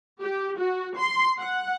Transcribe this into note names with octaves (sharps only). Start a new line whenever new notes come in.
G4
F#4
C6
F#5